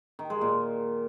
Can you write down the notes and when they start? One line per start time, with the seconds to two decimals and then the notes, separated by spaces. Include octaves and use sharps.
0.19 D#3
0.30 G#3
0.41 A#2